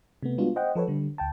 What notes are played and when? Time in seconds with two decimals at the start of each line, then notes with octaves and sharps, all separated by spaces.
0.23 C3 A3 B3
0.38 G3 G#3 B3 D4 F4 F#4
0.56 C5 D#5 F#5 G5
0.75 F3 A4 B4 C#5
0.88 D3 G3
1.18 D2 G5 A5